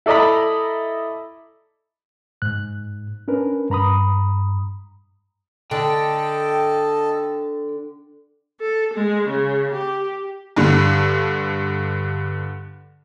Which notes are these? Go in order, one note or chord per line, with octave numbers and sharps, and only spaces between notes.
E4 A4 D5 D#5 A#5 B5
G#2 F#6
C#4 D4 A#4 B4
G2 A#5 B5 D#6
D3 A4 D#5 G5 A5
A4
G#3
C#3
G4
G2 D3